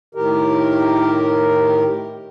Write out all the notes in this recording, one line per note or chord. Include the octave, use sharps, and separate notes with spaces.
A2 D#3 G4 A#4